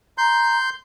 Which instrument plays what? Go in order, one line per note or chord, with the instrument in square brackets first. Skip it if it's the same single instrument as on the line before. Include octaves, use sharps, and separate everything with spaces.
[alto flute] A#5 [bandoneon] C6 G6